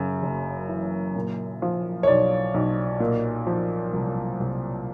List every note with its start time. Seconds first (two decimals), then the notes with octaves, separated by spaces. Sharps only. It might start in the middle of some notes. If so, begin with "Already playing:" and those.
Already playing: F#2 C#3
0.23 F#1
0.69 E3
1.16 A#2
1.62 F3
2.03 C#5
2.07 B1 D5
2.54 B1
3.00 A#2
3.47 F3
3.93 C2
4.39 C2